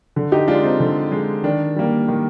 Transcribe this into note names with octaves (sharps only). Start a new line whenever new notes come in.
D3
D#4 G4
G#3 D4 F4
C4 D#4
D3
G#3
D#3 D4
G3 A#3
D#3